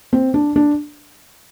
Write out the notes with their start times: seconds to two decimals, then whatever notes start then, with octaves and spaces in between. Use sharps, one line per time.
0.13 C4
0.34 D4
0.56 D4